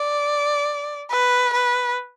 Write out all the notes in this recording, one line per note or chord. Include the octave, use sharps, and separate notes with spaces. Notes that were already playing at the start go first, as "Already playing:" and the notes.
Already playing: D5
B4
B4